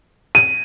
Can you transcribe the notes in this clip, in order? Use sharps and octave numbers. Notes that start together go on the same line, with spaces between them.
D#7